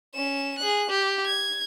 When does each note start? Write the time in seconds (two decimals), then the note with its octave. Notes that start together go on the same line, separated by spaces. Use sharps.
0.15 C#4 E7
0.58 G#4 F#6
0.89 G4
1.25 G#6